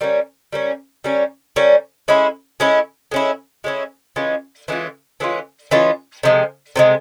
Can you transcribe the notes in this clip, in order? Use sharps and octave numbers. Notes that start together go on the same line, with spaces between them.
G3 A#3 C#4
G3 A#3 C#4
G3 A#3 C#4
G3 A#3 C#4
G#3 C#4 E4
G#3 C#4 E4
G#3 C#4 E4
G#3 C#4 E4
E3 G#3 C#4 F4
E3 G#3 C#4 F4
E3 G#3 C#4 F4
E3 G#3 C#4 F4
C3 F3 G#3
C3 F3 G#3